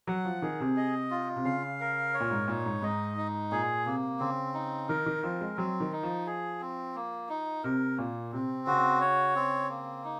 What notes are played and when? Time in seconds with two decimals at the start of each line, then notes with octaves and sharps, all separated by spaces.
0.07 F#3 F#5
0.25 F3
0.42 D#3 G#4
0.60 C3
0.77 D#5
1.11 F4
1.36 C3
1.45 C#3 F5
1.80 A#4
2.14 C#5
2.20 A#2
2.31 G#2
2.48 A#2 D#4
2.66 G#2
2.82 G#2 D#5
3.17 D#4
3.52 A#2 G#4
3.86 C3 A#3
4.20 C#3 C4
4.54 D#4
4.89 D#3 A#4
5.06 D#3
5.23 F3 C4
5.41 G#3
5.57 F#3 C4
5.80 D#3
5.92 D#4
6.03 F3
6.26 G#4
6.61 C4
6.95 A#3
7.29 D#4
7.64 C3 A#4
7.97 A#2 A#3
8.32 C3 C4
8.67 C#3 F#4
9.01 C#5
9.35 C4
9.69 A#3
10.04 D#4